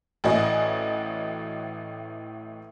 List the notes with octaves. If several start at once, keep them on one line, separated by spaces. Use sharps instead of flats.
A1 A2 F#4 D5 D#5 G#5